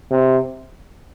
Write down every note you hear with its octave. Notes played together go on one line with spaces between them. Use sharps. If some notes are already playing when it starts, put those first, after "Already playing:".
C3